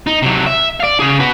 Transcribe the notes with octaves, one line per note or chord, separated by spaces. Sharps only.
D#4
C3 F#3
E5
D5 F5
C#3 G#4
F#4 B4